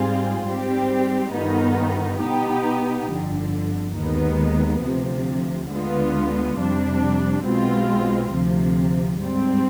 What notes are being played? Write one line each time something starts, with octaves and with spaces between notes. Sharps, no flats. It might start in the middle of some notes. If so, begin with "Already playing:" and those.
Already playing: G#2 G3 C4 F4 G#4
G#2 G3 C4 G4
G1 G2 D#3 B3 D#4
B2 B3 D#4 G4
G1 F2 D3
D#2 D#3 G#3 B3
D2 C3 F3
D2 D3 G#3 B3 F4
F2 C3 G3 D4
B1 B2 G#3 C4 F4
D2 C3 F3
G#2 G3 C4